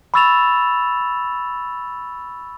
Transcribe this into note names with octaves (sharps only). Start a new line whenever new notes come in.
B5 C#6 E6 A6 E7 F7